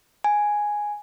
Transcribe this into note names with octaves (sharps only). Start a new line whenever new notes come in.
G#5